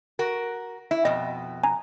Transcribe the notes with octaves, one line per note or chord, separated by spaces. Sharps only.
F#4 A#4
E4 E5
F2 B2 D#5
G#5 A#5